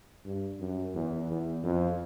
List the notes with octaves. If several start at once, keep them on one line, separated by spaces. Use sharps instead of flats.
G2
F#2
E2
E2
F2